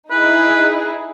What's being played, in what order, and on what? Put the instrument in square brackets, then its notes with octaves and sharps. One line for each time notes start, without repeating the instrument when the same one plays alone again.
[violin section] D#4 E4 G#4 [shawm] B4